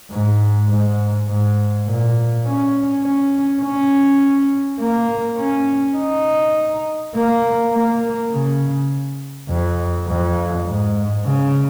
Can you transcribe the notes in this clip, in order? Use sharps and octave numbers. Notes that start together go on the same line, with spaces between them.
G#2
G#2
G#2
A#2
C#4
C#4
C#4
A#3
C#4
D#4
A#3
A#3
C#3
F2
F2
G#2
C#3